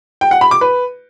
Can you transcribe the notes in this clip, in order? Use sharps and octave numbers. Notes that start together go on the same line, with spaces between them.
G5
F#5
B5
D6
B4